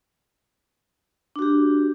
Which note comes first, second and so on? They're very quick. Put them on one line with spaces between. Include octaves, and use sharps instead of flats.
D4 F#4 G4